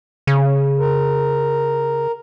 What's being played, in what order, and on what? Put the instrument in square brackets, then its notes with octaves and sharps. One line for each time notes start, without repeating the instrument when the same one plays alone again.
[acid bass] C#3
[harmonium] A#4